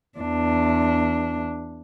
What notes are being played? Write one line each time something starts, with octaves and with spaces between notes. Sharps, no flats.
E2 D4